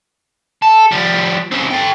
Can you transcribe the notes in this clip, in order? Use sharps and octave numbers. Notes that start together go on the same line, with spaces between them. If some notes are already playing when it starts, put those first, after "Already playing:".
A4
F3 G3
C#3 C4
A4 G5